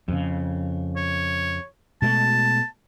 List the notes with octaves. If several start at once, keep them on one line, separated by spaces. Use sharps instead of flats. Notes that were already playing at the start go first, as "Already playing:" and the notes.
F2 C#3
C#5
B2 G#3 A3 A5